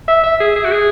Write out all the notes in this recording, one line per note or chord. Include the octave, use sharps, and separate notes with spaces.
E5
E5
G#4
G#4
F#4
G#4